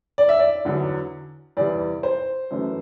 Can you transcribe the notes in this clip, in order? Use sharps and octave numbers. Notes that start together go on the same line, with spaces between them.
D5
E5
D5
E2 D3 F#3
E2 C3 E3 G3 D5
C5
F#2 E3 A3